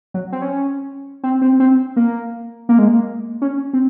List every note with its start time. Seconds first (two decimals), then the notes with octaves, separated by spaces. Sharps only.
0.14 F#3
0.32 C4
0.42 C#4
1.24 C4
1.42 C4
1.60 C4
1.96 A#3
2.69 A#3
2.79 G#3
2.88 A#3
3.42 C#4
3.73 C4